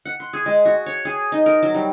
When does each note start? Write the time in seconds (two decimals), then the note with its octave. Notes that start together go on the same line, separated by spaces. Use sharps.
0.05 F#5
0.20 C6
0.33 G#4
0.46 G#3
0.65 F#4
0.86 C#5
1.05 G#4
1.32 D#4
1.46 A#4
1.62 F#3
1.74 G3